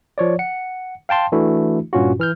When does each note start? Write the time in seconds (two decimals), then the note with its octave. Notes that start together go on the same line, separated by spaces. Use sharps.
0.18 F3 C#5 D5
0.39 F#5 C#7
1.09 F5 G5 A5 C6
1.32 E3 A3 D4 E4 F#4
1.93 G2 A#2 C#4 F4 F#4
2.19 E3 F6 G6